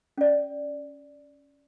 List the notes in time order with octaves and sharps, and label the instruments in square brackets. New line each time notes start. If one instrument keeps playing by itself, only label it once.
[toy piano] C#4 D5